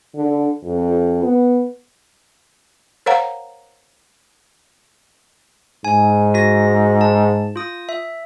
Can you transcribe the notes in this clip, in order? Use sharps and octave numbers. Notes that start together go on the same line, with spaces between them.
D3
F2
B3
A#4 C5 C#5 F5 F#5 A#5
G#2 G#5
F#4 A#6
A5
F4 D#6
E5